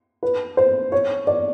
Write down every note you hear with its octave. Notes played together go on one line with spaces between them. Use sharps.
B4
C5
C#5
D5